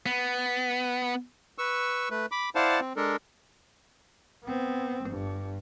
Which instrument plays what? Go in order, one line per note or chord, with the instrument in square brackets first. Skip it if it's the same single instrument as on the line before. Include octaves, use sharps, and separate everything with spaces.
[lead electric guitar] B3
[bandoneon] B4 C#6 E6
A3 B4
B5 D6
E4 C5 D5 F5 F#5 A5
C4
G#3 D4 A4 A#4
[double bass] B3 C4
G1 G2